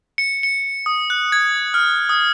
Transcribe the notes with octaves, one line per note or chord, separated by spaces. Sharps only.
C#7
C#7
D#6
F#6
G#6
F6
D#6